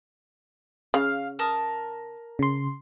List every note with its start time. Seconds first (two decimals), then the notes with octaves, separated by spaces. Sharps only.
0.94 C#3 F5
1.39 A#4 A5 D#6
2.39 C#3 C6